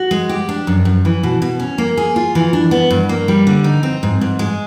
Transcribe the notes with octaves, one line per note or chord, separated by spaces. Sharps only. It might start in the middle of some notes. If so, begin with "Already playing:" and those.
Already playing: F#4
G#3
G4
D4
F#2
F#2
E3
B2
B2
C#4
A#3
G#4
F4
E3
D4
B3
G2
A#3
G3
D3
D#4
C4
G#2
G#2
G#3